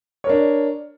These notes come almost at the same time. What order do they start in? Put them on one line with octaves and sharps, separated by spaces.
C#5 A#4 D4